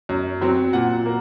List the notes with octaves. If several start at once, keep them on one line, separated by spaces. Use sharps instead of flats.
F#2
F#3 C4
A#2 F#5
A#3